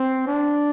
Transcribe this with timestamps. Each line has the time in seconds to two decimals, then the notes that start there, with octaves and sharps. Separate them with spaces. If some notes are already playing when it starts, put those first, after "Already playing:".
Already playing: C4
0.27 D4